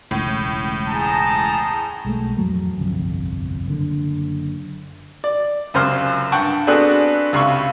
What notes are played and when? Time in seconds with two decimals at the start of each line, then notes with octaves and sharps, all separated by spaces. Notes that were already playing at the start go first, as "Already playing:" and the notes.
0.11 E1 C#2 A2
0.89 G#4 A5 A#5
2.05 B1 G#3 A3
2.37 A1 F2 F#3 A3
2.78 G1 C2 F2
3.66 F#1 D3
5.24 D5
5.74 C#2 F#2 C3 C5 F6
6.32 G2 F#5 G5 A5 C#6
6.67 B3 C4 D4 F#4 G#4 A4
7.33 C#2 C3 F5 B5 C#6